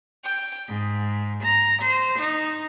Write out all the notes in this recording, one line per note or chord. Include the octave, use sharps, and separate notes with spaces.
G5
G#2
A#5
C5
D#4